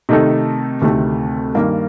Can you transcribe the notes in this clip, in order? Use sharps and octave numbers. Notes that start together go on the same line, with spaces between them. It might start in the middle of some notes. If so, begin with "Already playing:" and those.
C3 D#3 A3 D#4 A4
D2 C3 D#3 A3
G2 D#3 A#3